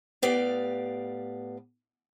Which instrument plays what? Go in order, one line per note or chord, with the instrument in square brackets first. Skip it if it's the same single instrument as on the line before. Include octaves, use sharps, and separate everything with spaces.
[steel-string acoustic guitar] A2 B3 G4 D5 F5